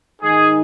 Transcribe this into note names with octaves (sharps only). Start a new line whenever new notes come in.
G#2 D#3 G#3 D#4 G#4